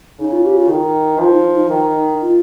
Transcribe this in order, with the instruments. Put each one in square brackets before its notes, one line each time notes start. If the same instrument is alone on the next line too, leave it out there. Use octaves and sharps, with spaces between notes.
[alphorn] C#3 [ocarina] D#4
[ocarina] F4
G4
F4
[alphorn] D#3 [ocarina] D#4
[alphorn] F3 [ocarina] F4
[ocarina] D#4
D#4
[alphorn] D#3
[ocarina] F4